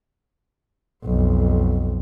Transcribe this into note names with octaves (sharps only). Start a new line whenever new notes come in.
B1 F2